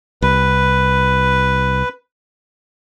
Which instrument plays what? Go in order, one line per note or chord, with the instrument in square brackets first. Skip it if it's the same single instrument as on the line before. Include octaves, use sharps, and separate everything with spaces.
[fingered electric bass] C2 [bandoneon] B4